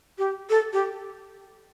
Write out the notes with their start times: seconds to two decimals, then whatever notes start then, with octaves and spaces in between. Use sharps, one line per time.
0.18 G4
0.50 A4
0.73 G4